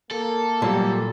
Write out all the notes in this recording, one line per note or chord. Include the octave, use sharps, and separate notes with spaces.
A#3 A4
A#2 F#3 G3 G4